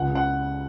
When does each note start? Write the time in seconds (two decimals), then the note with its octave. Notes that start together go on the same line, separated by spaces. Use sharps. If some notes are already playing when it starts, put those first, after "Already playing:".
Already playing: C#2 F#5
0.10 C#3
0.15 F#5